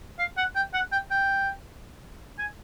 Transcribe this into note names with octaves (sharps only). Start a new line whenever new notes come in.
F5
F#5
G5
F#5
G5
G5
G#5